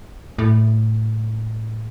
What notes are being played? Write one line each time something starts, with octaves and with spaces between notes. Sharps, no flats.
A2